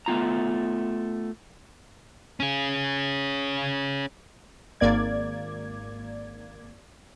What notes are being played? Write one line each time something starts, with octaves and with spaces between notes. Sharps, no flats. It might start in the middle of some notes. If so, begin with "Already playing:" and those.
A3 B3 F4 A#5
C#4 G#4
G#1 A#3 D5 G#6